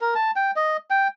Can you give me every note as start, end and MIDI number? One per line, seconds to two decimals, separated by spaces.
0.01 0.14 70
0.15 0.31 81
0.36 0.51 79
0.56 0.77 75
0.90 1.08 79